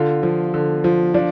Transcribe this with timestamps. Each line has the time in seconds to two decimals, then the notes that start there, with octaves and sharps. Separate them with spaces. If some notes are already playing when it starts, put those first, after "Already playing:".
Already playing: D3 F4
0.23 F3
0.54 D3
0.84 F3
1.14 F3 D4